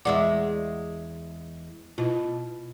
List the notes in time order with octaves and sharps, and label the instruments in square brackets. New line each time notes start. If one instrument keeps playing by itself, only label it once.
[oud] E2 G#3 E5 [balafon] D5 F#5 D6
[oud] B2 [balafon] E4 F4